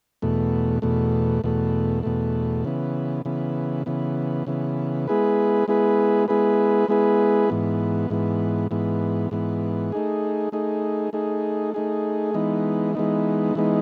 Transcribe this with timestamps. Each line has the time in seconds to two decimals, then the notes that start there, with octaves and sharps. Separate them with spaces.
0.22 E2 B2 A3
0.82 E2 B2 A3
1.44 E2 B2 A3
2.03 E2 B2 A3
2.65 C#3 E3 B3
3.25 C#3 E3 B3
3.86 C#3 E3 B3
4.47 C#3 E3 B3
5.07 G#3 B3 E4 G#4 B4
5.68 G#3 B3 E4 G#4 B4
6.28 G#3 B3 E4 G#4 B4
6.88 G#3 B3 E4 G#4 B4
7.50 G#2 E3 B3
8.10 G#2 E3 B3
8.71 G#2 E3 B3
9.31 G#2 E3 B3
9.92 A3 D#4 G#4
10.52 A3 D#4 G#4
11.13 A3 D#4 G#4
11.74 A3 D#4 G#4
12.34 E3 G#3 B3 D#4
12.95 E3 G#3 B3 D#4
13.55 E3 G#3 B3 D#4